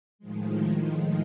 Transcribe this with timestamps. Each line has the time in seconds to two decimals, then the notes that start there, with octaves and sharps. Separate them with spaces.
0.19 A2 D#3 F3 G#3